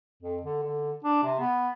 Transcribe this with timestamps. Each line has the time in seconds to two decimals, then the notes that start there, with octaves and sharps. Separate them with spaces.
0.22 F2
0.42 D3
0.63 D3
1.04 D4
1.23 C3
1.39 B3